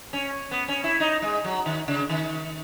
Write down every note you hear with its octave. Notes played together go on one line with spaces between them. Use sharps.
C#4
B3
C#4
E4
D#4
G#3
F#3
D#3
C#3
D#3